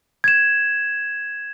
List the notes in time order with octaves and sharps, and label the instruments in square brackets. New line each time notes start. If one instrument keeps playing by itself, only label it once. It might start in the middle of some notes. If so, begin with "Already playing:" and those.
[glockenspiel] G#6 E7